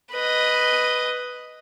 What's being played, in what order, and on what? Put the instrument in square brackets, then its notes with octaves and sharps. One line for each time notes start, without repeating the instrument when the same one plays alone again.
[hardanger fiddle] B4 D#5